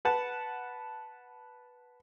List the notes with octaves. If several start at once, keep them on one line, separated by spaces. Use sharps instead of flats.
B4 F#5 A5